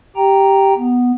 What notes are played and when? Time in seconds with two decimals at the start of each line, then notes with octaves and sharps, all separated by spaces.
0.16 G4 G5 A#5
0.77 B3